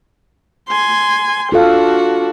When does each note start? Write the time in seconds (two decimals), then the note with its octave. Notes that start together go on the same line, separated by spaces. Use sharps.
0.68 G#5 C6
1.52 D4 F4 F#4 A4 F5